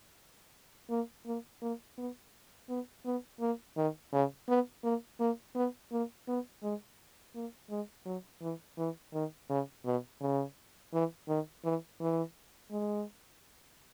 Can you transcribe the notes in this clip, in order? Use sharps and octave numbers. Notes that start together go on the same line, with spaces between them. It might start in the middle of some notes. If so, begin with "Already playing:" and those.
A#3
A#3
A#3
B3
B3
B3
A#3
D#3
C#3
B3
A#3
A#3
B3
A#3
B3
G#3
A#3
G#3
F#3
E3
E3
D#3
C#3
B2
C#3
E3
D#3
E3
E3
G#3